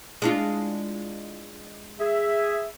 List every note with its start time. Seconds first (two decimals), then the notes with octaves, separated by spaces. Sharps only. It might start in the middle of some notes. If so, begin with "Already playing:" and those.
0.22 G#3 D4 F4
2.01 G#4 E5